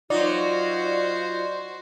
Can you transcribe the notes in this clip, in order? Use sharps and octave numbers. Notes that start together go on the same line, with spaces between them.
F#3 D#4 F4 F#4 C5 D5